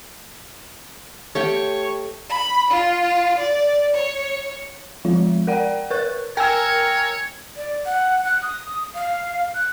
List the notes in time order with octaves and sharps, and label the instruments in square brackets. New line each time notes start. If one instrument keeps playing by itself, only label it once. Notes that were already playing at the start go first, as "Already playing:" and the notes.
[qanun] A3 G4 G5 [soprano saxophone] C#5
[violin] B5
F4
D5
C#5
[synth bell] F3 G#3 F4
A#4 D5 F#5 G5
A#4 B4 C#5 C#6 F#6 A6
[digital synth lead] A#4 [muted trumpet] C#5 [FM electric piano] G5 G#5 E6
[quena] D5
F#5
F#6
D#6
F5
F#6